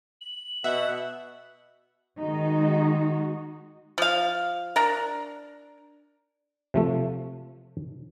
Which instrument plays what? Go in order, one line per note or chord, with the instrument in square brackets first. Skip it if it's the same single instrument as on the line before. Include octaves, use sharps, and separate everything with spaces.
[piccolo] F#7
[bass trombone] B2 [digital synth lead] E5 [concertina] F#5
[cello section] D#3 G#3 D#4 F#4
[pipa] F3 F5
D4 A#4
[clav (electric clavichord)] C3 F3 A3